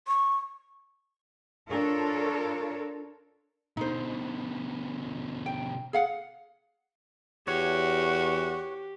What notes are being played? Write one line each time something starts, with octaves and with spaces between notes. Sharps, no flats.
C#6
D4 F4 A4 A#4 C#5
B2 D3 D#4 C5
G5
G#4 F5 F#5
E2 F#4 G4 C#5